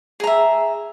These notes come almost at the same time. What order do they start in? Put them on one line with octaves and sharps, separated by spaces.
G#4 A#5 E5